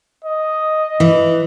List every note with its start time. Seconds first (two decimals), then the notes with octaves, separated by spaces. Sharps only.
0.24 D#5
1.00 E3